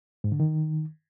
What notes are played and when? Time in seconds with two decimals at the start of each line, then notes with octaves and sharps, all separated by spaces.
0.24 G#2
0.32 D3
0.40 D#3